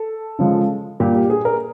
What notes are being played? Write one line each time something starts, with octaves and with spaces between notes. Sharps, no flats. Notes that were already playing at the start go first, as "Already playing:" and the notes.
Already playing: A4
C#3 F3 G#3
A#2 G3 G4
G4
G#4
A#4